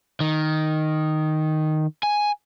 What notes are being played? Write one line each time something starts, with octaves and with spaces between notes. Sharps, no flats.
D#3
G#5